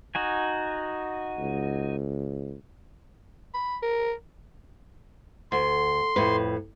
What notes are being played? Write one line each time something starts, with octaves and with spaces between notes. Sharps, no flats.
D#4 F#4 G#5
C#2
B5
A#4
D2 C6
F2 A2 B4